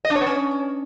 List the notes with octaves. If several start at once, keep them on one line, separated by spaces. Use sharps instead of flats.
D#5
D4
C#5
B3
C#4